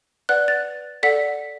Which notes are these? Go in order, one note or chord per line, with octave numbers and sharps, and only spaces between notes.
B4 D5 F#5 F#6
A6
A4 D5 F#5 B6